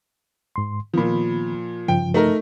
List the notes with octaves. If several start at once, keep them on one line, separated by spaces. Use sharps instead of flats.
G#2 C6
A#2 D#3 F3 B3 B5
G2 C#3 F3 G5
A3 D#4 A#4